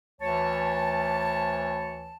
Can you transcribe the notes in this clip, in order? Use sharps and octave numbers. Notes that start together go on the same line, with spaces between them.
D2 E3 C#5 A5